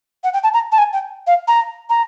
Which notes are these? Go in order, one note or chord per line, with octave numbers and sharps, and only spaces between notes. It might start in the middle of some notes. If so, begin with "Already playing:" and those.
F#5
G5
A5
A#5
A5
G#5
G5
F5
A#5
A#5